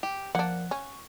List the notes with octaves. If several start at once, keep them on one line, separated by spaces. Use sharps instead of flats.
G4
F3 A#3 D4 F#5
C#4 C#6